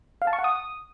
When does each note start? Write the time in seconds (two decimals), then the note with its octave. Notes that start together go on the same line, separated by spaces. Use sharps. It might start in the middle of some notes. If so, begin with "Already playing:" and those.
0.22 F5
0.27 A5
0.33 C#6
0.39 F#5
0.44 D#6